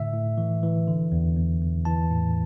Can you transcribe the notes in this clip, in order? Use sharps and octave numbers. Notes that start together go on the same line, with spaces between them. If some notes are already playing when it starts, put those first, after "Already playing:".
Already playing: A2 D3 E5
A2
E3
E3
D3
E2
E2
E2
E3 A5
A2